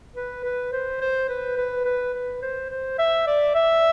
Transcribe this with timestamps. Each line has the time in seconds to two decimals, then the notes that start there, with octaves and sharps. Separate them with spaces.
0.16 B4
0.44 B4
0.72 C5
1.01 C5
1.29 B4
1.57 B4
1.85 B4
2.13 B4
2.42 C5
2.70 C5
2.98 E5
3.26 D5
3.55 E5